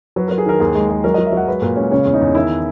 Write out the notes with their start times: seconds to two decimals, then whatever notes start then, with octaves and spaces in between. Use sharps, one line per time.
0.16 F#3 B4
0.28 F#3 A#4
0.38 G#4
0.46 D#3 A#4
0.60 D#2 G#4
0.75 G#3
0.89 G#3
1.04 F#3 A#4
1.14 F#3 D#5
1.26 E5
1.33 F#3 F#5
1.47 G#3 B4
1.62 A#2 A#4
1.76 G#3 C#4
1.91 C#3 C#4
2.05 E2
2.14 D#4
2.21 E2
2.35 D#3 E4